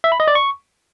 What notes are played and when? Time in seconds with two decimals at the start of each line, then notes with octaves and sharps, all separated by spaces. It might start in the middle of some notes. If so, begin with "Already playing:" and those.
0.04 E5
0.12 B5
0.20 D#5
0.28 D5
0.35 C#6